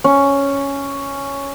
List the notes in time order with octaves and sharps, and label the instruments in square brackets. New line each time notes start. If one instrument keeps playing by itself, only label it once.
[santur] C#4